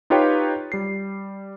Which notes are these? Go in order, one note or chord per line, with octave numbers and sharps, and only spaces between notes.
D#4 F4 G4 B4 C#5 G5
G3 C7